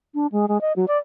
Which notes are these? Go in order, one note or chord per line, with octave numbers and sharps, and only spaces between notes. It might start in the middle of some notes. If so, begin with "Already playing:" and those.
D4
G#3
G#3
D#5
F#3
D5